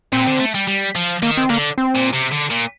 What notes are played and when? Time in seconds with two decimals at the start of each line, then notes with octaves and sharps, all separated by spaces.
0.13 A#2 C4
0.27 D3
0.40 A3
0.55 G3
0.68 G3
0.95 F3
1.23 D#3 A#3
1.37 C4
1.50 D3 A#3
1.78 C4
1.95 A#2
2.14 C3
2.32 D3
2.51 A#2